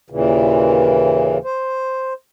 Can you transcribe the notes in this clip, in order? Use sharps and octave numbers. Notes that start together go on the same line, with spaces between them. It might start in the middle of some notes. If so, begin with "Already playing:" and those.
D#2 A#2 C#3 E3
C5